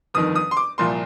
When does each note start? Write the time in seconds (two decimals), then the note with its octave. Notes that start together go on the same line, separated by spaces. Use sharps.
0.14 G1 F2 D#3 D#6
0.35 D#6
0.51 C6
0.57 D6
0.78 C2 A#2 F3 C6